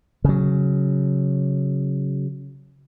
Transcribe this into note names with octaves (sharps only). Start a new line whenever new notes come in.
C#3 F#3